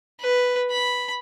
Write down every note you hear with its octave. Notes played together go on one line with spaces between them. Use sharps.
B4
B5